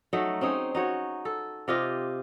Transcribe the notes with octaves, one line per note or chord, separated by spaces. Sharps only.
F#3 A3 D#4
C4 C#4 D#4 G#4
D#4 F#4 C#5
A4
C3 F4 G4 D#5